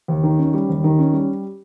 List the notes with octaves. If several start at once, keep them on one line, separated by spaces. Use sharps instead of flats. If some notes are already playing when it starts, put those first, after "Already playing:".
D#2
D#3
C#4
G3
D#2
D#3
C#4
G3